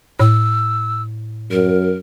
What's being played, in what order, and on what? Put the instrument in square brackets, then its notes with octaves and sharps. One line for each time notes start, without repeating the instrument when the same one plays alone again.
[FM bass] A2 [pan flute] E6
[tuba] F#2 [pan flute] A#4